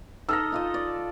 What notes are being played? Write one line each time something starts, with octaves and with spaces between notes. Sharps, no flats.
D#4 A4 D#5 E6 F6 A#6
D#4 F4 D#5
D5